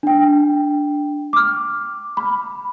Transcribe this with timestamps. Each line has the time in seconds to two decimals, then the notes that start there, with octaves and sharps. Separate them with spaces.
0.03 D4 G5
1.33 D6 F6
2.17 B5